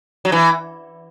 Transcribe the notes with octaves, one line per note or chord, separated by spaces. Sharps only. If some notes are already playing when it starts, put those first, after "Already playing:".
F#3
E3